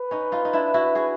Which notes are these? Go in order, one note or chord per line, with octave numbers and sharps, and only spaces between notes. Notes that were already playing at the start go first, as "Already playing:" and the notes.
Already playing: B4
C#4 D#4
D#4 F4
D#4
D4 E4
E4 F#4
F#4 G#4